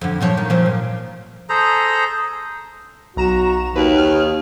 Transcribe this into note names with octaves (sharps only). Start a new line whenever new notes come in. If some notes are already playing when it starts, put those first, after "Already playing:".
F2 D3
A#2 F3 C#5
D#3
A#2 F3 C4
A#2
G#4 A4 C5 A#5
B1 F#4 A#5 E7
D#2 F#4 B4
D#3 F6